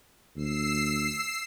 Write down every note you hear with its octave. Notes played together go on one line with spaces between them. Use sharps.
D2 E6 C7